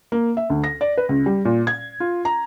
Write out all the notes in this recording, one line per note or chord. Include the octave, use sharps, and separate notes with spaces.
A#3
E5
D2
A#6
D5
B4
C#2
G3
A#2
G#6
F4
A#5